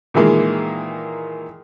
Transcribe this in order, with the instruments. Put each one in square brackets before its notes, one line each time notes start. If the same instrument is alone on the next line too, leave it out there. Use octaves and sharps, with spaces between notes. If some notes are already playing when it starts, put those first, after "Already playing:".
[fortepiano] A#2 D#3 E3 G#3 A#3